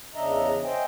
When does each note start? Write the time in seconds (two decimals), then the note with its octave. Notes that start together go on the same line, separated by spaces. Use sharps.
0.15 E2 C#3 D4 D#5 E5 A#5
0.64 C5 D#5 E5 G5 G#5